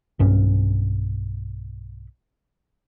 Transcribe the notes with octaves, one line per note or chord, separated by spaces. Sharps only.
B1 G2 C#4